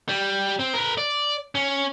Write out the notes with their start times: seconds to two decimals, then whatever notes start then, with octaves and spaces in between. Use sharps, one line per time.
0.09 G3
0.59 C4
0.74 A#4 B4
0.97 D5
1.55 C#4